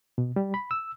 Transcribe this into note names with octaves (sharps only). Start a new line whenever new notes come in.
B2
G3
B5
E6